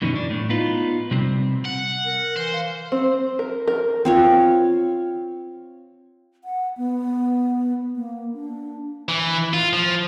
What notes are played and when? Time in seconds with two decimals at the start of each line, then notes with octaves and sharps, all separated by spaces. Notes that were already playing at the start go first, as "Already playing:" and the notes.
0.02 F#2 B2 D#3 E3 B3 C#4
0.16 D4
0.30 A2
0.49 B3 D#4 F4 B4
1.11 C3 G3 C4
1.66 F#5
2.06 A#4
2.37 E3 C5
2.53 F5
2.92 C4
3.39 A#4
3.68 A#4
4.05 C4 F4 C#5
6.44 F#5
6.78 B3
7.96 A#3
8.34 D4
9.09 E3
9.53 F4
9.73 F3